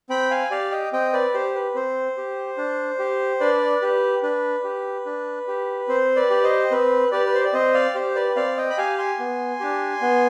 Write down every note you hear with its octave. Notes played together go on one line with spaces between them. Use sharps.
C4 G5 B5
F5 G#5
G4 D5 F5
D#5 G5
C4 D#5 G5
B4 D5
G4 C5
B4
C4 C5
G4
D4
G4
D4 B4 D5
G4 B4
D4 B4
G4
D4
G4
C4 C5
B4 D5
G4
C5 D#5
C4 B4
G4 B4 D5
B4
C5
D5
C4 C5 D#5
D5 F5
G4 C5
B4 D5
C4 D5 F5
D#5 G5
B5
G4 F5 G#5
G#5 C6
B3
D4 G4
B3